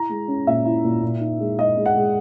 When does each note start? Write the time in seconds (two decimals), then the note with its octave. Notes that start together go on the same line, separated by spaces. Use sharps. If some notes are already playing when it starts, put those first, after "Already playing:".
Already playing: E4 A#5
0.09 G#3
0.28 C#4
0.47 A#2 E5
0.65 E4
0.84 A#2
1.03 A#2
1.21 D#4
1.39 G#3
1.59 G#3 D#5
1.77 G#3
1.86 F#5
1.96 G#3